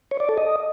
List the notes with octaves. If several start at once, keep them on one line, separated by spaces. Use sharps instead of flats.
C#5
D5
A4
D#5